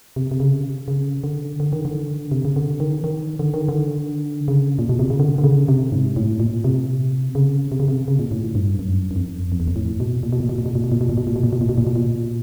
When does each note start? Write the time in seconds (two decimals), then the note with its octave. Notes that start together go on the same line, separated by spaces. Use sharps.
0.16 C3
0.31 C3
0.40 C#3
0.88 C#3
1.24 D3
1.60 D3
1.73 D#3
1.85 D3
2.31 C3
2.45 C#3
2.56 D3
2.80 D#3
3.04 D#3
3.39 D3
3.54 D#3
3.69 D3
4.48 C#3
4.79 A#2
4.89 B2
4.99 C3
5.10 C#3
5.20 D3
5.38 D3
5.44 C#3
5.68 C3
5.92 G#2
6.16 A2
6.40 A#2
6.64 C3
7.35 C#3
7.72 C3
7.80 C#3
7.88 C3
8.08 C#3
8.19 A#2
8.31 A2
8.55 G2
8.79 F#2
9.11 F#2
9.16 F2
9.52 F2
9.60 E2
9.68 F2
9.76 A2
10.00 B2
10.23 A#2
10.33 B2
10.40 A#2
10.49 B2
10.58 A#2
10.66 B2
10.75 A#2
10.84 B2
10.92 A#2
11.01 B2
11.09 A#2
11.17 B2
11.27 A#2
11.36 B2
11.43 A#2
11.53 B2
11.61 A#2
11.69 B2
11.78 A#2
11.87 B2
11.96 A#2